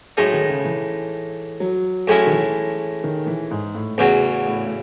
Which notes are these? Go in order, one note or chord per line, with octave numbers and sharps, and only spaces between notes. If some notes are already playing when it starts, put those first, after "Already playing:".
A2 F#3 G#3 D#4
D#3
C#3
E3
F#3
A2 F#3 G#3 C#4 E4
D#3
E3
D#3
E3
G#2
A2
E2 C#3 F#3
A2
A2